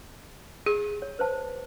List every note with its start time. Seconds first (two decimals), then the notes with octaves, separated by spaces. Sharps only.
0.66 G4 G#4
1.02 C#5
1.19 B4 C5 A5